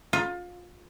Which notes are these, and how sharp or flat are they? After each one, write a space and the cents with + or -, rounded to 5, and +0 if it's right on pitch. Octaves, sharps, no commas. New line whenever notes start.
F4 +25